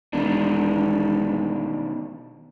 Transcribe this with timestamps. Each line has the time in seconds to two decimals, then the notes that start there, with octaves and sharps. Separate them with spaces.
0.13 E1 B2 D#3 D4